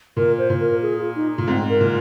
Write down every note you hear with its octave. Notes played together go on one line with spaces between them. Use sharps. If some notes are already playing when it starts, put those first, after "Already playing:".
A#2 A#4
C5
A#2
A#4
G#4
F4
D#4
A#2
G#2 C4
A#4
A#2